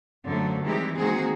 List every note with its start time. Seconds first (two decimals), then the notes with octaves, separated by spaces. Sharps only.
0.25 F#2 D3 F3 F#3 A3
0.64 D#3 E3 G3 G#3 C4 G4
0.96 D#3 G#3 A#3 C4 F#4 G#4